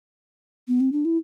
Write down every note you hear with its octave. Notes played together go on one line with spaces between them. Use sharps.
B3
C4
D4
E4